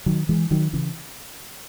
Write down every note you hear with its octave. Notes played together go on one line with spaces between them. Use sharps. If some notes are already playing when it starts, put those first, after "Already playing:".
D#3 F#3
E3 G#3
D#3 F#3
C#3 E3